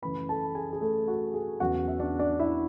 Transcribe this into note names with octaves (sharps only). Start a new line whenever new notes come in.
F#2 C#3 E3 A3 C#4 B4 B5
A4 A5
G#4 G#5
G#4
A3 A4
F#4
G#4
E2 C#3 F#3 F#4 F#5
E5
D4 D5
D4 D5
E4 E5